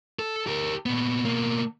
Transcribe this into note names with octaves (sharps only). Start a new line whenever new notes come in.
A4
G4 A#4
A#2 B3
B2 A#3